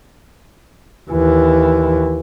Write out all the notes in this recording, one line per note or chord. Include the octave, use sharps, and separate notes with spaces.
D#2 E3